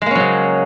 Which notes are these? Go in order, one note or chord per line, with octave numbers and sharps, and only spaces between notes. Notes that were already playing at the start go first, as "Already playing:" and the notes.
C#3 F#3 G#3 A#3 C#4